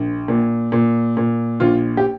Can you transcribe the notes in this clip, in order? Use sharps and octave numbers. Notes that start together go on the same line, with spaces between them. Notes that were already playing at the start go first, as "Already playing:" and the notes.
Already playing: A#1
A#2
A#2
A#2
A#1 F4
G4